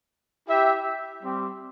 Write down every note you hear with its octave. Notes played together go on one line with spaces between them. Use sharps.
E4 G4 E5 G5
G3 C4 G4